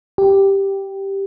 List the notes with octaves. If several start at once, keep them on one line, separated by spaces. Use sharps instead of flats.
G4